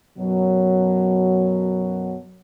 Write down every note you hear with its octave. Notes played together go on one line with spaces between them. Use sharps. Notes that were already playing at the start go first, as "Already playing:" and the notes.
F#2 B2 F#3